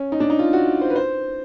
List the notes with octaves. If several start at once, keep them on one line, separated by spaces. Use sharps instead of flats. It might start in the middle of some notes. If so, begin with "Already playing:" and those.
Already playing: C#4
D#4
D4
D#4
F4
F#4
C5
B4
C5